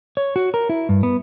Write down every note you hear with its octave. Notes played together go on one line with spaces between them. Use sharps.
C#5
F#4
A#4
E4
G2
B3